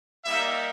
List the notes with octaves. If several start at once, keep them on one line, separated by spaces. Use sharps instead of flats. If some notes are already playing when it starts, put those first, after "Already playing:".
G3 A#3 D#4 E5